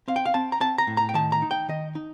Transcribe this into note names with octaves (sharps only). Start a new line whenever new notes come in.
C4 F5
G5
F5
C4 A5
A#5
C4 A5
A#5
A2
A#5
G5
D#3 A5
A#5
D#4
G5
D#3 D#5
D#4